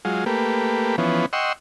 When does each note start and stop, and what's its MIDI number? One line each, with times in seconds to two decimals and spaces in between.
0.05 0.24 54
0.05 0.24 56
0.05 0.24 65
0.26 0.96 57
0.26 0.96 58
0.26 0.96 67
0.26 0.96 71
0.98 1.26 52
0.98 1.26 53
0.98 1.26 59
0.98 1.26 61
1.33 1.53 75
1.33 1.53 78
1.33 1.53 79
1.33 1.53 84
1.33 1.53 85
1.33 1.53 88